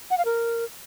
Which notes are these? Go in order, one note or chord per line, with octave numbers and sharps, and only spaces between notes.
F#5
F5
A#4